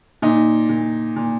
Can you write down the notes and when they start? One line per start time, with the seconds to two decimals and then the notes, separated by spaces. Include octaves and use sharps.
0.22 A#2 D#4
0.69 A#2
1.16 A#2